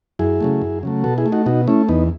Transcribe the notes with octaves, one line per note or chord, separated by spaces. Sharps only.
F#2 E4 G#4
C#3 F#3 A3
F#2
C#3 F#3 A3
B2 F#4 A4
E4 G#4
A3
D#4 F#4
B2 D#4 F#4
A3 C#4 E4
E2 B3 D#4